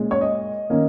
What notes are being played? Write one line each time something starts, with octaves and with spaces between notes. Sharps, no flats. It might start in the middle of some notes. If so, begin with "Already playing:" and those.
Already playing: A#2 G#3 C#4
C#5
D#5
D#3 A#3 C#4